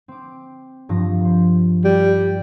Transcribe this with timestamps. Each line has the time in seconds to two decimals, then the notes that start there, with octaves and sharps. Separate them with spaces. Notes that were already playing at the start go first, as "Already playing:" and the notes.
0.08 C4 D6
0.89 G2 F3 A#6
1.21 A#4 C5
1.85 G3